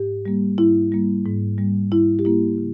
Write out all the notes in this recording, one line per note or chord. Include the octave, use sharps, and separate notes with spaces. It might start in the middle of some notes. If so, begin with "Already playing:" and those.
Already playing: G#2 G4
G3 A#3
G#2 E4
G3 A#3
G#2
G3 A#3
G#2 E4
G4
G3 A#3 E4
C#3